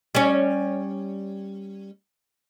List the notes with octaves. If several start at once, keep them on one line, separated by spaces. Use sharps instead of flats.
G3 C#4